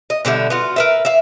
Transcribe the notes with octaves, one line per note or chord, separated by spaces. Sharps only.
D#5
B2 D3 G3 E4
B3 F4 F#4
A#4 B4 E5
E5 F5